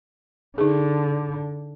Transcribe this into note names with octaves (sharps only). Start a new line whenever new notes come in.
D3 D#4 G#4